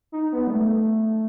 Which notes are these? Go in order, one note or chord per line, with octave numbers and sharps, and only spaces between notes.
D#4
B3
G3
A3